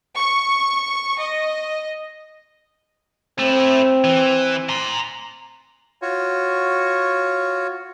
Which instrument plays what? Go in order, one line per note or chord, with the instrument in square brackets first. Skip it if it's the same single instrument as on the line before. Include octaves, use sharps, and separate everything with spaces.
[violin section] C#6
D#5
[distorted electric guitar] A3 E4 [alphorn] C4
[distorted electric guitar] E3
A#5 C6
[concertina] F4 F#4 C#5